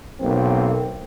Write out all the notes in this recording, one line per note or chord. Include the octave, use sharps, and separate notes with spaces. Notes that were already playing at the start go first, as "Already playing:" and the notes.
B1 A#3 C4